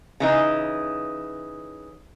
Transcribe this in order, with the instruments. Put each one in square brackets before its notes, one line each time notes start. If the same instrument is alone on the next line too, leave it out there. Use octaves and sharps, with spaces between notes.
[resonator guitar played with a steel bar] C#3 E3 D#4